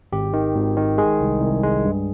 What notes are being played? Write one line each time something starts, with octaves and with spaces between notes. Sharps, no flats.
G#1 G4
D#3
G#1
D#3
G#3 G#4
C2
C2
G#3
G2